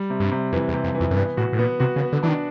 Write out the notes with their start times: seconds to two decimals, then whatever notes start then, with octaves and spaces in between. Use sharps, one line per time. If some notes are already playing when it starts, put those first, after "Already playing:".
Already playing: G3
0.10 C3
0.20 G2
0.32 C3
0.52 F2 E3
0.69 E2
0.74 C3
0.84 F2
0.95 E3
1.00 F2
1.11 F#2
1.16 G2 B3
1.37 A2 F#4
1.53 A2
1.59 A#2 B3
1.80 C3 F#4
1.96 C#3
2.01 B3
2.13 D3
2.23 E3 D4
2.28 D#3